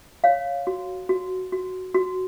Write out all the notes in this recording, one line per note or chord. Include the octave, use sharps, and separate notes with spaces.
C#5 F5
F#4
F#4
F#4
F#4